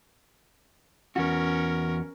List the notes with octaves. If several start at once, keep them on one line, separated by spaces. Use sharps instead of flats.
E2 C#4 F#4 A#4